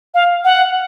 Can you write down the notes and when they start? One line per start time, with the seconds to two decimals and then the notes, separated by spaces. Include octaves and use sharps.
0.14 F5
0.44 F#5